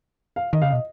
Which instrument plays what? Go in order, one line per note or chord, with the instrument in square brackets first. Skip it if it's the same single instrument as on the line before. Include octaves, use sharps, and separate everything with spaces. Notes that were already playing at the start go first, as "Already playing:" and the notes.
[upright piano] F5
[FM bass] D#3 [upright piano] D#5
[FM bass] C#3 [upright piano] F5
[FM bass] B2 [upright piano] D#5